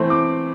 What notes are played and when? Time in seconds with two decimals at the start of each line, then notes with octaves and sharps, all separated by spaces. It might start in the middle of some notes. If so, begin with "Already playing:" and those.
Already playing: E3 A3 C4 C6
0.10 D6